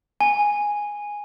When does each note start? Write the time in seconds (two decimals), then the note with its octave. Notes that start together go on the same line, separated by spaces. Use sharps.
0.21 G#5